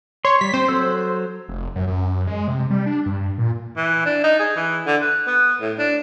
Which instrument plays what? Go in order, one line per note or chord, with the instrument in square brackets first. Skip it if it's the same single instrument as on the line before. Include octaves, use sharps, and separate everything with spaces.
[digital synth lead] C#5 [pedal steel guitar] C6
[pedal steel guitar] G3 [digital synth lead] B6
[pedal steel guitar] C4 [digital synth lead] C5
[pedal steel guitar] F#3 A4 E6
[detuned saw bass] F1
F#2
F#2
G#3
C3
G3
D4
G2
A#2
[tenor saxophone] E3
D4
D#4
G#4
E3
D3
B4
B3
A2
D4